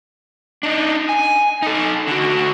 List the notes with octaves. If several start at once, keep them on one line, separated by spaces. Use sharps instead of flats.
D4 D#4
G#5
D#4 A4
D3 F#4